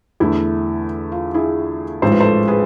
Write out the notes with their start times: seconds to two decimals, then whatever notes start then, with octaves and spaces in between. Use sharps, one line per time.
0.20 E2 D3 A3 E4
1.12 F4
1.34 E4 G#4
2.02 A1 G#2 F3 G#3 C5
2.12 B4
2.20 A4 C5
2.48 G#4 B4